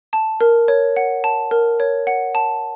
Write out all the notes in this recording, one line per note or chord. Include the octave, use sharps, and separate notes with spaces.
A5
A#4
C#5
F#5
A5
A#4
C#5
F#5
A5